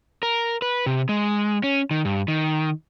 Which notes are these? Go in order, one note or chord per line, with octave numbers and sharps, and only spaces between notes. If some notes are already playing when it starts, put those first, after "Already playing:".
A#4
B4
C3
G#3
C#4
D#3
G2
D#3